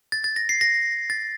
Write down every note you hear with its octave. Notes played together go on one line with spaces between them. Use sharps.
A6
A6
A#6
C7
A#6
A6